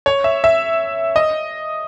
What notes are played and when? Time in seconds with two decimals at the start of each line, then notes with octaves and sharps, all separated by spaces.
0.06 C#5
0.24 E5
0.44 E5
1.16 D#5